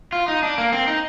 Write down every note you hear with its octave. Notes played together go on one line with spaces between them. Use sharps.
F4
D#4
D4
A#3
C4
D#4